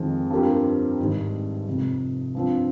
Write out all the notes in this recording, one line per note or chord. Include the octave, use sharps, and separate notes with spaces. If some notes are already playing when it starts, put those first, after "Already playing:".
Already playing: F2 D#3 G#3 C4
G2 F3 C4 G4 A#4
G#1 G#2 G3
F1 F2 C3
G2 F3 C4